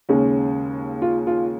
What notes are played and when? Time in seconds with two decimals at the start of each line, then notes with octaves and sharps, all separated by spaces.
0.09 D#2 C#3 G#3 C#4
1.02 F4
1.27 F4